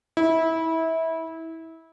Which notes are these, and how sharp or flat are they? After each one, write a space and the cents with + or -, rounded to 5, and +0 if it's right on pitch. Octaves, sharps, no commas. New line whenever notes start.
E4 -25